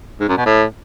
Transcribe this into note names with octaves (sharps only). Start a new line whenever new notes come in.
G#2
F#2
B2
A2